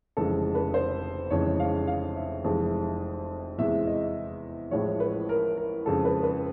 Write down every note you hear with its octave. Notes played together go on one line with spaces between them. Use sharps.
F1 F2 C#3 E3 G#3 A4
B4
C5
F1 F2 C#3 E3 G#3 C#5
F5
F5
E5
F1 F2 C3 E3 G#3
E2 C3 E3 G#3 E5
D#5
A1 A2 F3 G#3 C#5
B4
A#4
A#4
F2 C#3 F3 G#3 A4
B4
B4